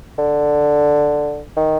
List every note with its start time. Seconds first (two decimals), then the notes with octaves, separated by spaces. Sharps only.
0.18 D3
1.57 D#3